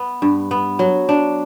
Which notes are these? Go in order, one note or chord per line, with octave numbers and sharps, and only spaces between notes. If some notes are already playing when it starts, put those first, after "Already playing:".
Already playing: B3
G2
B3
F#3
D4